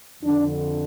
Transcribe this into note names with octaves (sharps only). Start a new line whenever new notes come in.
F2 D3 D4